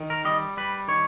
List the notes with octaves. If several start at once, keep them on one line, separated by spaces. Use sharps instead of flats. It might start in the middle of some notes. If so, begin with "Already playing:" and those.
Already playing: D#3
A#4
G3 D#5
G3 B4
D#3 C#5